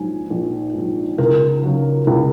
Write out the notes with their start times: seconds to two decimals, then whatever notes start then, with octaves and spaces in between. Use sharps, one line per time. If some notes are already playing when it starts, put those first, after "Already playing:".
Already playing: A#1 G#2 F#3 G#5
0.30 A#1
0.74 G#2 F#3
1.18 C#2 A#4
1.63 C#3 F#3
2.07 C#2